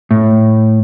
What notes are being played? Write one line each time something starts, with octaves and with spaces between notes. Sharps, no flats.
A2